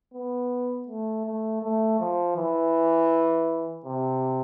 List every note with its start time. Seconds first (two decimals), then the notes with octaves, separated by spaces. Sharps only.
0.14 B3
0.88 A3
1.25 A3
1.62 A3
2.00 F3
2.37 E3
3.85 C3